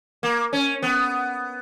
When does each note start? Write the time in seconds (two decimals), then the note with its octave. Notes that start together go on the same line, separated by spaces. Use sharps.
0.23 A#3
0.53 C#4
0.82 B3